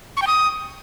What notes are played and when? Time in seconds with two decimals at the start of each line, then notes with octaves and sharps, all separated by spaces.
0.17 C#6
0.22 G5
0.27 D#6